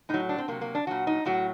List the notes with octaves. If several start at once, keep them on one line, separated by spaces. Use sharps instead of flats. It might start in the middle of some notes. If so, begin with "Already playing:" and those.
A2 F#3 D#4
D4
C4
C3 F#3 A#3
A#3
D4
A#2 F#3 F#4
D#4
A2 F#3 F#4